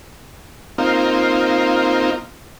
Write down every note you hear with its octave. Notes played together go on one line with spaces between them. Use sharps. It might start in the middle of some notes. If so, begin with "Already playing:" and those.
A#3 C4 D#4 F4